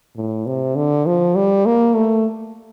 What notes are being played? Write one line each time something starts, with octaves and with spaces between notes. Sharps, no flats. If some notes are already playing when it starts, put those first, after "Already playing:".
A2
C3
D3
F3
G3
A#3
A3